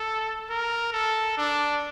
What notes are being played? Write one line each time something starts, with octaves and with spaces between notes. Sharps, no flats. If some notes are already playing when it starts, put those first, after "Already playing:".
Already playing: A4
A#4
A4
D4